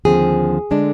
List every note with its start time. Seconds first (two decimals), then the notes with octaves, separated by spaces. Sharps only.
0.05 D#2 D3 F3 C4 G#4
0.71 D3 G#3 D4